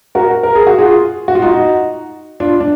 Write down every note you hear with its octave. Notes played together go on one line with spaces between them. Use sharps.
F#4 A#4
A#4
G#4
F#4
F4 G#4
F#4
F4
D#4 F#4
D4 F4
D4